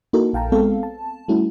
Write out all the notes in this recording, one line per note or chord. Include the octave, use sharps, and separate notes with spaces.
A#3 D#4 E4 F#4 A4 A#4
A#1 F5 G5 A5 A#5
G#3 B3 C4 A4 F5
A5
G3 A3 C#4 E4 F#4